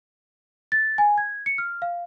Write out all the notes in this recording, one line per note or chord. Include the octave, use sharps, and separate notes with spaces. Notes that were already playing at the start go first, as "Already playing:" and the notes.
A6
G#5
G#6
C#7
F6
F5